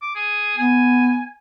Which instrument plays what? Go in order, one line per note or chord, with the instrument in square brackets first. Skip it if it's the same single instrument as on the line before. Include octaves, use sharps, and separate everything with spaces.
[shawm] D6
G#4
[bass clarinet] B3 [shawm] G#5